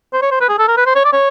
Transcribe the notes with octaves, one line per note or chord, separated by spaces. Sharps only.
C5
C#5
C5
B4
G#4
A4
A#4
B4
C5
C#5
D5
C#5